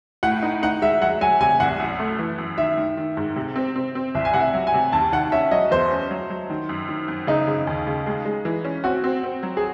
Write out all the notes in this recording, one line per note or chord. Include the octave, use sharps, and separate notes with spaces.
A2 F#5
D#4
D#4 F#5
G#3 E5
F#3 F#5
F#3 G#5
C3 G#5
C2 F#5
F#2
A3
E3
F#2
D#3 E5
D#3
D#3
G#2
C3
C4
C4
C4
C2 E5
G#5
C3 F#5
E5
F#3
G#5
C3
D#2 A5
D#3 F#5
C#4 E5
F#3 D#5
E2 C5
C#4
F#3
F#3
D#3
F#2
D#3
F#2
C#3 D#4
C#3
D#2
C#3
G#3
G#3
E3
C#4
C4 F#4
C4
C4
F#3
G#4